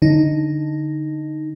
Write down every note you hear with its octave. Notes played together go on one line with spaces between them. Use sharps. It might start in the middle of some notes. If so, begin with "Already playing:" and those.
D3 D#4